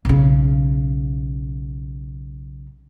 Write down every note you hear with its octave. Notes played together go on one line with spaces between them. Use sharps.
B1 C#3